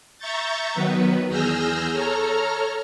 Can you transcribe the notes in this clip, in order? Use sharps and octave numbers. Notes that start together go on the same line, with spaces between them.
E5 A#5 C#6 G6 A6
D#3 F#3 B3 B4
E2 G#4 E6 F6 G6 A#6
A4 C#5 A#5 F6